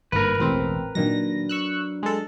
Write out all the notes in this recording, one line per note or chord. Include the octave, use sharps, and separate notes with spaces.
G1 G#2 A#3 A#4 B4
E1 A1 C4
A#2 D#3 F#3 C4 D4 A#6
C#6 E6 F#6
G#3 A4